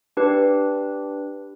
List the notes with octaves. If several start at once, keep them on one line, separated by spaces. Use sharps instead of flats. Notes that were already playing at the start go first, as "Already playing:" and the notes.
D4 G4 B4